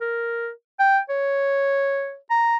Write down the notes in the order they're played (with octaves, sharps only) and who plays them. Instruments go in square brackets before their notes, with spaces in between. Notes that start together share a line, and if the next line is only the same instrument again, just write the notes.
[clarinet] A#4
G5
C#5
A#5